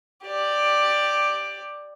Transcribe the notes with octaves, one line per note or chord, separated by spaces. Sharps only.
G4 D5